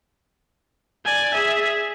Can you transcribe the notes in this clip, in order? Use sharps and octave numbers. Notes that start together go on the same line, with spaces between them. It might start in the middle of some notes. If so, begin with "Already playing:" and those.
D5 G#5
G#4 E5